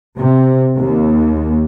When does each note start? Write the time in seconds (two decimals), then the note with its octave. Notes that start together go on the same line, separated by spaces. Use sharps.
0.16 C3
0.78 D#2